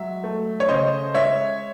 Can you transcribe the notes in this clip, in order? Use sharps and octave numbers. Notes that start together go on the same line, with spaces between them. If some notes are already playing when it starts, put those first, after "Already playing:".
Already playing: F#3 G#3 E5
A3
C#5
C#3 C5 D#5
G#3 C#5 E5